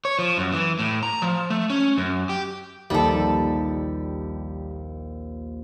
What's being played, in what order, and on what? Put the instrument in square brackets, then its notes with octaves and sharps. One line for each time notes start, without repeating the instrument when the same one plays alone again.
[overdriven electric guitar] C#5
F3
F#2
E3
A2
A#5
F3
A3
C#4
F#2
G4
[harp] A#1 D#2 D#4 [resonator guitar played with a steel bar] G3 A4